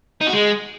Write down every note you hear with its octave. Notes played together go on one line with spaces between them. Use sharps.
D#4
F#4
G#3